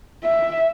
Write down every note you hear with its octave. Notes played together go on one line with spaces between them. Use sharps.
E5